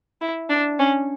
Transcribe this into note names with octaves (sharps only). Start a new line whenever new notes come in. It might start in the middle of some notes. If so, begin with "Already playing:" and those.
E4
D4
C#4